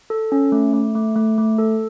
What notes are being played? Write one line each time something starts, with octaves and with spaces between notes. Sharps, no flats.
A4
C#4
A3
A3
A3
A3
A3
A4